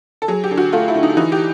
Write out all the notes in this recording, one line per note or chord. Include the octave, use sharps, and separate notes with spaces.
A4
F#3 G#4
G4
D3
F#4
A3 F4
E4
D3
D#4
E3 D#4
G4